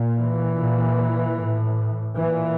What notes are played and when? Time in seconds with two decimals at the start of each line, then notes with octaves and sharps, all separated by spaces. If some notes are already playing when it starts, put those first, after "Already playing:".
Already playing: A#2
0.16 E3
0.56 A#2
1.36 A2
2.15 A#2 E3